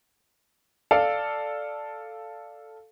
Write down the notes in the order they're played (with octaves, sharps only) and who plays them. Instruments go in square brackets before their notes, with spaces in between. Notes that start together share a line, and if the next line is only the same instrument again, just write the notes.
[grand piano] A4 D5 F5